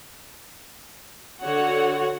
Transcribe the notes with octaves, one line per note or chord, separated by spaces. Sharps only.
D3 F#4 C#5 F#5